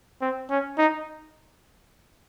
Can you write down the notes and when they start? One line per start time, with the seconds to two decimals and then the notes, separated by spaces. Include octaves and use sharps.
0.21 C4
0.50 C#4
0.78 D#4